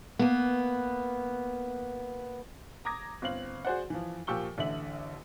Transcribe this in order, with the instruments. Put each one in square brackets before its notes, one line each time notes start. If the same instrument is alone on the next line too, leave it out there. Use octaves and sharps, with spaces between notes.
[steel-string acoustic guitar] A#3 B3
[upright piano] A#5 D6 D#6 G#6 A#6
G1 C4 F5 F#7
F#4 G#4 C5 D5 F#5
E3 F3
A#2 F3 G4 C#6 E6 G7
A1 D3 E5 F#7